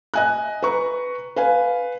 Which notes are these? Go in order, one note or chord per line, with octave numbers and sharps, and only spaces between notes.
D#5 G#5 F#6
B4 A#5 C#6
B4 F5 G#5